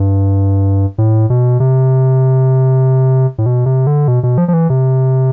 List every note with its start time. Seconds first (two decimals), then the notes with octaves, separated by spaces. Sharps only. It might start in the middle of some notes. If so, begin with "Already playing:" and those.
Already playing: G2
0.98 A2
1.30 B2
1.60 C3
3.38 A2
3.46 B2
3.66 C3
3.87 D3
4.08 B2
4.23 B2
4.38 F3
4.48 F3
4.53 E3
4.70 C3